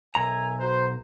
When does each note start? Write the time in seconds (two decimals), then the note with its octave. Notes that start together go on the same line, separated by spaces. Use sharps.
0.15 B1 A#4 E5 G#5 A#5
0.59 F#4 B4 C5